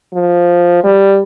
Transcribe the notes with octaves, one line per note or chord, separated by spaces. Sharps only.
F3
G3